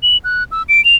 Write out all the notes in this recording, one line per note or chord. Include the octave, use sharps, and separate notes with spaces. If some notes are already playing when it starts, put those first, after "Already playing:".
F#7
F#6
E6
D7
F7